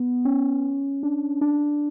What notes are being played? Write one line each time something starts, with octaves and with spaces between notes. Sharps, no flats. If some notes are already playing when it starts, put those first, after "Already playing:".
Already playing: B3
C#4
D4
D4